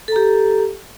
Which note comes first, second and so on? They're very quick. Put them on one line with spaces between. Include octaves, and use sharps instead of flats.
A4 A#5 G4